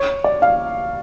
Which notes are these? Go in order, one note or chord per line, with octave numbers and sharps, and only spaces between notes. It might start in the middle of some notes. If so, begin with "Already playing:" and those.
Already playing: C#5
D5
F5